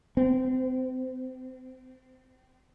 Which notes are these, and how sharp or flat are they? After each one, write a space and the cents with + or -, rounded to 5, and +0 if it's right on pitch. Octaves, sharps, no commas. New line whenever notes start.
C4 -30